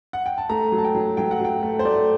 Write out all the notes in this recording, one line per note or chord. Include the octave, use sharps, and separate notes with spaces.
F#5
G5
A5
A3 A#5
F#3
A5
G5
F#3
F#3 G5
F#5
F#3 G5
A3
C5
A3 D5